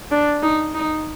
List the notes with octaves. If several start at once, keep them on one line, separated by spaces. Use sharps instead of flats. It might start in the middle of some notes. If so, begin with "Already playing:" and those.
D4
D#4
D#4